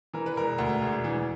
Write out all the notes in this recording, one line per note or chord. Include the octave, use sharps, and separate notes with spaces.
E3 A#4
B4
E1 A#4
D2
E1
E3